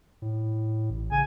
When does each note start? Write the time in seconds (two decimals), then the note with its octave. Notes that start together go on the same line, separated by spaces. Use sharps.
0.22 A2
0.90 A1
1.11 C#3 G#5